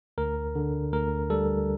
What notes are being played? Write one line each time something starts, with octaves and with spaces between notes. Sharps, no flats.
D2 A#4
D3
D2 A#4
G3 A4